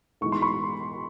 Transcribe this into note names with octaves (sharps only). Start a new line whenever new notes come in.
B1 A2 E3 G#3 C#6
C6
B5 C#6